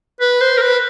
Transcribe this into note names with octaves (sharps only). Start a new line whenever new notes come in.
B4
C5
A#4
B4